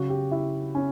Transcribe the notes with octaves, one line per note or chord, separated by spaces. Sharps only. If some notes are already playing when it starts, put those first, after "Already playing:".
Already playing: C#3 F#3 F#4
G4
E4
C#4